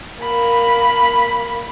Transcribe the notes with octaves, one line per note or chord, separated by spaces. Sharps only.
A#3 B5